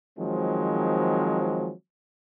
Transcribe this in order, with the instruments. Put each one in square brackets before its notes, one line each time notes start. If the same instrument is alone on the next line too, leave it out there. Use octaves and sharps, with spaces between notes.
[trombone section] D#3 F3 F#3 G#3 C4